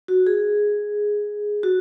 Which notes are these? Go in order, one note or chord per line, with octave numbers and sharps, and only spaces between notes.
F#4
G#4
F#4